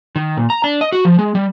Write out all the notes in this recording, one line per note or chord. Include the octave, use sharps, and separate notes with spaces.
D#3
A#2
A#5
D4
D#5
F#4
F3
G#3
G3